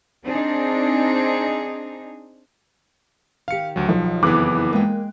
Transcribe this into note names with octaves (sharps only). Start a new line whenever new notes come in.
C4 D4 D#4 G#4
D#3 G4 F5 C#7
D2 F#3
B1 F3
F#1 F2 E3 B3 D6 F#6
G#3 A#3 G5